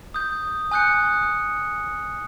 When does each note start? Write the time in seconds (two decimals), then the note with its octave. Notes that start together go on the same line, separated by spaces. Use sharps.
0.14 D#6 G6
0.71 G#5 D#6 F#6 G6 C#7